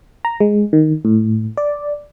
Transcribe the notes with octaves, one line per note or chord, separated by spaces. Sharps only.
A#5
G#3
D#3
A2
D5